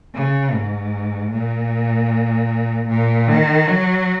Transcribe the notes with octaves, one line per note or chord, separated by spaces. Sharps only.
C#3
G#2
A#2
A#2
D#3
F#3